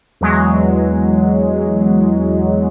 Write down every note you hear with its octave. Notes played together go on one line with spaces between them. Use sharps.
E2 F#3 G#3